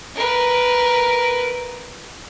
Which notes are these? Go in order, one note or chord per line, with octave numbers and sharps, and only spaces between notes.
A#4 B4